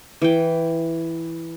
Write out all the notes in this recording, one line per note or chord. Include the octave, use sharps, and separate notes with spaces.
E3 G5